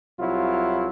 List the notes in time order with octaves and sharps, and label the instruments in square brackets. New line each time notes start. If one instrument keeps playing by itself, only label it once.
[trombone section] C2 F#3 E4 F4